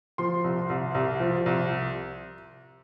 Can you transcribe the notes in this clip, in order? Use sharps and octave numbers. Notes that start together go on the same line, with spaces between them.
F3 C6
C2
C2
C2
F3
C2